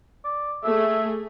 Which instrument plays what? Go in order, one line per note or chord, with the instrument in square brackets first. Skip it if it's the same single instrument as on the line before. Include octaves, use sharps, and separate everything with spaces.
[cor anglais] D5
[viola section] A3 G#4 [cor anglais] E5